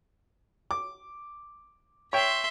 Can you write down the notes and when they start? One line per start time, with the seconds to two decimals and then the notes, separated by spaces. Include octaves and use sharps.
0.71 D6
2.13 C#5 E5 G5 C6